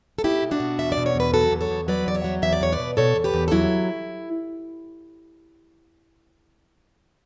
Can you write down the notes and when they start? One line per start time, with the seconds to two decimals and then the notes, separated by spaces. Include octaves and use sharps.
0.18 A4
0.24 B2 E4 G4
0.42 B2
0.51 D4 F#4
0.60 B2
0.78 E2 E5
0.92 D5
0.97 B2
1.06 C#5
1.15 E2 B4
1.33 F#3 F#4 A4
1.51 E2
1.61 A4 C#5
1.70 E2
1.88 F#3 B4 D5
2.06 E2 D5
2.15 C#5 E5
2.24 F#3
2.42 E2 E5
2.53 D5
2.61 E2 C#5
2.72 B4 D5
2.79 B2
2.97 B2 A4 C#5
3.16 E2
3.24 G4 B4
3.34 E2
3.48 A4
3.52 F#3 E4